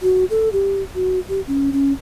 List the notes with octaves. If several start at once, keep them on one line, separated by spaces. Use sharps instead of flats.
F#4
A4
G4
F#4
G4
C#4
C#4